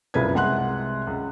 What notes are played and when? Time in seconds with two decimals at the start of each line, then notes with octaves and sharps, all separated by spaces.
0.14 F#1 C2 C#3 F4 B4 G#6
0.34 C2 G#3 F#5 C6 F#6
1.07 C#2